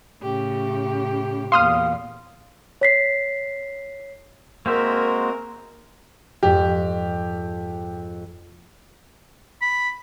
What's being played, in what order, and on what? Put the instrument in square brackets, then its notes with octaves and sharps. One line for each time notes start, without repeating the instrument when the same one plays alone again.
[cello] A2 C#3 [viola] G4
[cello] E2 A#2 [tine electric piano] F5 [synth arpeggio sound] C6 D#6 F6
[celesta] C#5 B6 C7
[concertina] G#3 F#4 C5 [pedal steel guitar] A#3 C4 E5 [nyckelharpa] A#4
[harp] F2 G#2 [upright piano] G4
[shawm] B5